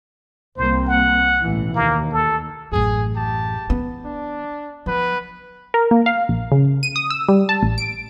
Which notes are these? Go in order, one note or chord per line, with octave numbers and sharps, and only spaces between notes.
C2 A#3 C4 C5
F#5
A1 B2 E3
D#2 A#3
A4
A1 F#2 G#4
G4 A5
E3 B3
D4
F3 B3 B4
A#4
A#3
F5
A#1
C#3
D#7
D#6
E6
G3
A5
A1
D7